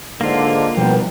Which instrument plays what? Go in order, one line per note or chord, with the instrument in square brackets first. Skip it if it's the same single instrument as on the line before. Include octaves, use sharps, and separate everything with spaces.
[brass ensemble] G#2 D3 [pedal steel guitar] A#3 F4
[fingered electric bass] B2 F3 G3 [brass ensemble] B3 A#4 G5